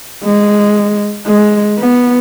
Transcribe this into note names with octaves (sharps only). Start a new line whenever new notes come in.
G#3
G#3
B3